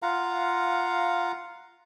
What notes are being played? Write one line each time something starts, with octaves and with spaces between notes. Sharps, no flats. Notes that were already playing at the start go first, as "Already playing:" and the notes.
F4 F5 F#5 A#5